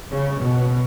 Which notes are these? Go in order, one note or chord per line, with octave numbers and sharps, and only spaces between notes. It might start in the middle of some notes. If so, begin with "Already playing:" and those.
C#3
B2